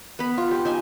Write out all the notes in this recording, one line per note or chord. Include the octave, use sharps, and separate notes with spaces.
B3 B5
F4
G4
D#4 E5 G#5